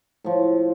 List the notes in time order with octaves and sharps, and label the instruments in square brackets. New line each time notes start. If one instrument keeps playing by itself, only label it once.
[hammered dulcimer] A2 F3